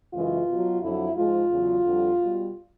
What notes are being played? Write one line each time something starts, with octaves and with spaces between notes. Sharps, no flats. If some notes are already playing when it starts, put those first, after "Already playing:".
F#2 C#3 E3 G#3 F4
B2 F#3
F2 D3 F#3 E4
G#2 F3 G#3 F4
E2 C#3 F#3
F2 D3 G3
B2 G3